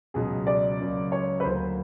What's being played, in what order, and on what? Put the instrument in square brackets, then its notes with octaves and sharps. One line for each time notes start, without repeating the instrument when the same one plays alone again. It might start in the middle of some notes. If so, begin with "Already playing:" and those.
[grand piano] C#2 B2 F#3 [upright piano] G#4
[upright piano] D5
[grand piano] C#2 C#3 F#3 A#3
[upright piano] C#5
B4
[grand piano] D2 D3 F#3 A#3 [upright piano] C5